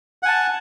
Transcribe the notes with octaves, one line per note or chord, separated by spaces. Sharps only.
F#5 G#5 A5